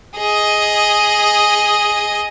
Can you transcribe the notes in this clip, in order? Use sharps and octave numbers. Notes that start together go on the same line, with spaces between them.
G#4 D#5